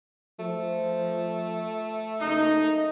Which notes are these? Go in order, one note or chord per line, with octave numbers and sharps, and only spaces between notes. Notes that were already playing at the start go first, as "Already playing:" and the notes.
F3 A3
F#1 D#4